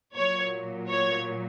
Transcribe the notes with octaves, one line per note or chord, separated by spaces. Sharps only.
A#2 F#3 C#5
C#5